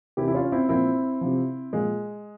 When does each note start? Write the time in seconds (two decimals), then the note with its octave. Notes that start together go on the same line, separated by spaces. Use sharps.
0.17 C3 E3 E4 G4
0.28 E4
0.34 C#4 F4
0.52 C4 E4
0.69 A#2 F3 C4 E4
1.21 C3 F3
1.73 A#2 F3 G#3